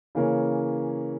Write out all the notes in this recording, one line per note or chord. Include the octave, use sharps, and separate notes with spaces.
C#3 E3 A#3 C#4